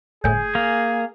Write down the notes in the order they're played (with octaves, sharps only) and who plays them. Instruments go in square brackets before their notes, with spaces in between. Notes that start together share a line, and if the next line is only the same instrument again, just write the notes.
[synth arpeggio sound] G1 A2 [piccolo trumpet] G#4 [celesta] G#5 G6
[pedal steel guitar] A#3